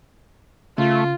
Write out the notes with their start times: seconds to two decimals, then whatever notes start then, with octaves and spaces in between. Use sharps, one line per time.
0.78 C#3 A3 F4